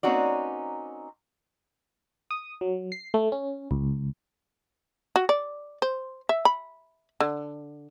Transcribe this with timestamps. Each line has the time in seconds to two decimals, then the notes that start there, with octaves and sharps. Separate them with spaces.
0.03 A#3 C4 C#4 D#4 F#4 D5
2.31 D#6
2.61 F#3
2.92 C7
3.14 A3
3.32 C#4
3.71 C#2
5.16 F#4
5.29 D5
5.82 C5
6.29 E5
6.45 B5
7.20 D3